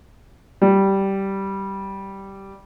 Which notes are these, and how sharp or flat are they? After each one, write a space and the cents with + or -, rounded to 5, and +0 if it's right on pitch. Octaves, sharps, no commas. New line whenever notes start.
G3 -10